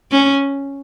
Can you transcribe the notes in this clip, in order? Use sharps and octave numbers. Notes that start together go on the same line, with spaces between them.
C#4